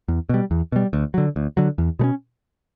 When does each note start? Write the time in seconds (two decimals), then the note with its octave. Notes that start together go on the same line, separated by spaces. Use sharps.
0.08 E2
0.29 B2 G3
0.51 E2
0.72 B2 G3
0.93 D2
1.14 D3 F#3
1.36 D2
1.57 D3 F#3
1.78 E2
1.99 B2 A3
2.04 C#4